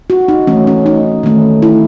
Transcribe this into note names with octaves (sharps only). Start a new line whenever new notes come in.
F#4
D#4
E3 A3 C#4
C#4
D#4
D#3 A3 C#4
E4